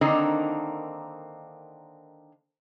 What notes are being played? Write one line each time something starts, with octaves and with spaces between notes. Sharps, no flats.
D3 D#3 A#3 C4 D4 D#4